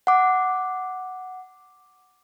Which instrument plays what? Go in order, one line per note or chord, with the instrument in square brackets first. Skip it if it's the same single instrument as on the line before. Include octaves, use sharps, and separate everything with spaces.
[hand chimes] F#5 D6